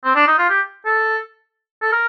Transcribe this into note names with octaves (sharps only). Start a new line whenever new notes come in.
C4
D4
D#4
F4
G4
A4
A4
A#4